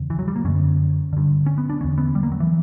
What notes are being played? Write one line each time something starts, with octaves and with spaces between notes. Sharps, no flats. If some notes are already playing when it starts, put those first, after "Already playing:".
Already playing: E2 C#3
E3
F#3
G3
A#3
F#2 D3 C#4
G2 D3
C#4
B3
D4
E2 D3 C#4
B3
G3
A#3
F#3
E3